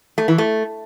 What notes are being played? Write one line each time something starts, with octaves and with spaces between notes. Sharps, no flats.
A3
E3
A3